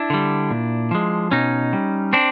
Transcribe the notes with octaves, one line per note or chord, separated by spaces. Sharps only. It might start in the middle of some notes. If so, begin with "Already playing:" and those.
Already playing: D4 E4
D3 G3
A#2
F3 G#3
B2 C#4 D#4
G3
C4 D4